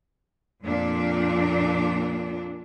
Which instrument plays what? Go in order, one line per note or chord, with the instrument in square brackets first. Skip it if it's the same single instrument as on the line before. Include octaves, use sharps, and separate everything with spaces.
[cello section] F2 A#2 D4